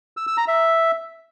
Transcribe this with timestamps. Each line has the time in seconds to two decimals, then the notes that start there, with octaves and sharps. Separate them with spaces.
0.17 E6
0.27 E6
0.37 A#5
0.48 E5